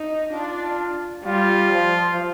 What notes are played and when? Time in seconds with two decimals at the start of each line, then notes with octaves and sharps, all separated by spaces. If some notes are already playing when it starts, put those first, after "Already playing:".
Already playing: D#4
0.32 D4 F4
1.26 G3 F4
1.73 F3